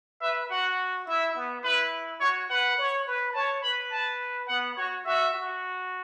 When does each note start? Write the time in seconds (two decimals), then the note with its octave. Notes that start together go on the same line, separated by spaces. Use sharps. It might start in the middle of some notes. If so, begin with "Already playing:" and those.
0.21 B4 E5
0.50 F#4 F#5
1.07 E4 E5
1.35 B3
1.64 E4 B4
2.21 F#4 C#5
2.50 B4 F#5
2.78 C#5
3.07 B4
3.35 C#5 A5
3.63 B4 B5
3.92 A5
4.48 B3 F#5
4.77 F#4 C#5
5.06 F#4 E5
5.34 F#4